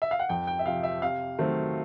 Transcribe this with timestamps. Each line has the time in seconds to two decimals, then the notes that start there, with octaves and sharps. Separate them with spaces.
0.02 E5
0.11 F5
0.19 F#5
0.29 F2 G5
0.47 G5
0.59 E5
0.66 C3 F3 F5
0.83 E5
1.02 C3 F5
1.39 D#3 F#3 A3 C4